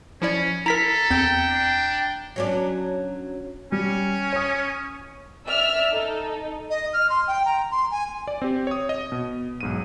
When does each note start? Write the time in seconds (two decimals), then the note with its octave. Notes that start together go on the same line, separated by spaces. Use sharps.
0.22 F3 C#4 E4 D5
0.66 E4 A4 A#4 A#5 B6
1.11 E2 C4 G5 G#6
1.49 D4
2.36 F#3 C#4 D4
3.72 G3 C#4
4.33 C#5 D#6
5.46 D5 E5 E6 F6
5.92 D#4 A4
6.70 D#5
6.93 F6
7.10 C6
7.27 G5
7.45 A#5
7.71 C6
7.91 G#5
8.28 D5
8.42 C4 G4
8.67 C#5 D#6
8.89 D#5
9.12 B2
9.61 B1 G#2 D#7